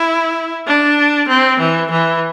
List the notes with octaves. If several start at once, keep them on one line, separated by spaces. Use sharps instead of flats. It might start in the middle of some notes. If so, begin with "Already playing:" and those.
Already playing: E4
D4
C4
E3
E3